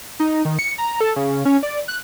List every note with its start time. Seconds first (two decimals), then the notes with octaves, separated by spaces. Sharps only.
0.20 D#4
0.45 D#3
0.59 C#7
0.78 A#5
1.01 A4
1.16 C#3
1.45 C#4
1.63 D5
1.88 F#6